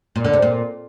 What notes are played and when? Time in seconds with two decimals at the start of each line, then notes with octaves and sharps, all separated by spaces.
0.16 A#2
0.24 D3
0.33 C3
0.42 A#2